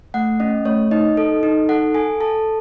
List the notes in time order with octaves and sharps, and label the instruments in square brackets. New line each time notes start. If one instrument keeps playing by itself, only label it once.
[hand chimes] A3 F#5
C#4 D#5
A3 C#5
D#4 D#5
A4
D#4
A4 F#5
A4 G#5
A4 A5